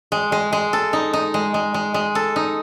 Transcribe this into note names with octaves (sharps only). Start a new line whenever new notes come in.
G#3
G#3
G#3
A4
D#4
D#4
G#3
G#3
G#3
G#3
A4
D#4